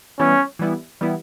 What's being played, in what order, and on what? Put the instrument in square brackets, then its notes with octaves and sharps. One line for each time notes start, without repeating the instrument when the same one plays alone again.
[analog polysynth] E3 G3 B3 E4 [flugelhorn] C#4
[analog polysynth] E3 G3 B3 E4
E3 G3 B3 E4